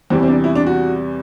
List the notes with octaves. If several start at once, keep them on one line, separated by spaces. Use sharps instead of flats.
E2 C3 E3 G3 C4
C4
D4
E4
D4
F#4